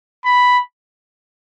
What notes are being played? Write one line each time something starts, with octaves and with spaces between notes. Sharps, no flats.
B5